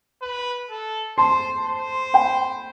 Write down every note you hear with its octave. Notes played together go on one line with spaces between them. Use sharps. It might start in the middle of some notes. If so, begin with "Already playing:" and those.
B4
A4
C5 A5 C6
C5
G5 B5